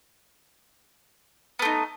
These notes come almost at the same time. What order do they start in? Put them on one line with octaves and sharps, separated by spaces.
B3 A3 D#4